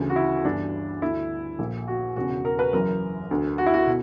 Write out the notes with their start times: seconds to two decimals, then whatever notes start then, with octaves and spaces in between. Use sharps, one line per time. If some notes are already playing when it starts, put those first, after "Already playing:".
Already playing: D2 C#3 E3
0.10 F#4
0.16 E4
0.45 G1 G2 E3 D4
1.02 D2 D3 E4
1.59 A#1 A#2
1.88 F#4
2.16 E1 E2 C#3 F#4
2.45 A#4
2.59 B4
2.73 F#1 F#2 E3 A#4
3.31 D2 D3
3.58 F#4
3.66 E4
3.74 F#4
3.87 B2